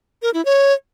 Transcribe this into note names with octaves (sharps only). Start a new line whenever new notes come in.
A#4
E4
C#5